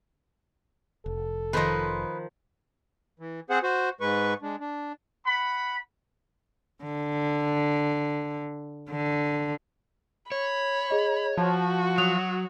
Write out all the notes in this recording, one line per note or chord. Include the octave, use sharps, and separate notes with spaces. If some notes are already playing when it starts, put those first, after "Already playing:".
F1 A4
D#3 F3 B4 C5 D#5
E3
C4 G#4 C5 F#5
F#4 C5
G#2 G#3 B4 C#6
G#3 D4
D4
F#5 B5
D3
D3
C#5 B5
G#4 D#5
F3 F#4 A5
F#3 D#6 F#6 F7